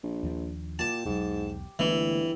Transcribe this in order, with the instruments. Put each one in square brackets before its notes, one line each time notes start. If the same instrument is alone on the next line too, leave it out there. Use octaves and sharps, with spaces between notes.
[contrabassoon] A#1
[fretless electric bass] D#2 F3 D4
[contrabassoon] A#2 [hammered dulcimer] G4 [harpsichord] A5
[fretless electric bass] E1 B1 F#3 [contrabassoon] G#2
[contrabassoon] G1 [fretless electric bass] D3 A3 A#3 [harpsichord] E3 [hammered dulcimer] E4